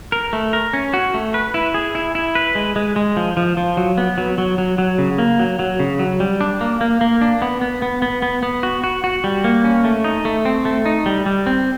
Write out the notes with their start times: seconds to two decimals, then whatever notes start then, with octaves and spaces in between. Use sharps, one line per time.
0.12 A#4
0.33 A3
0.53 A#4
0.73 C#4
0.94 F#4
1.14 A3
1.34 B4
1.54 E4
1.74 G#4
1.95 E4
2.15 E4
2.35 B4
2.55 G#3
2.76 G#3
2.96 G#3
3.17 F3
3.37 F3
3.57 F3
3.77 F#3
3.98 B3
4.18 F#3
4.38 F#3
4.58 F#3
4.78 F#3
4.99 C#3
5.18 A#3
5.39 F#3
5.59 F#3
5.80 C#3
5.99 F#3
6.20 G3
6.41 D4
6.61 A#3
6.81 A#3
7.01 A#3
7.21 D4
7.42 B3
7.61 B3
7.82 B3
8.02 B3
8.22 B3
8.43 B3
8.63 F#4
8.84 F#4
9.04 F#4
9.24 G3
9.44 A#3
9.64 C#4
9.84 A3
10.04 D#4
10.25 A3
10.45 C4
10.65 A3
10.86 D#4
11.06 G3
11.26 G3
11.46 C4